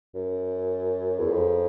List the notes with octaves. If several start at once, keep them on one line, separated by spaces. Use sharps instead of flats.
F#2
E2
F2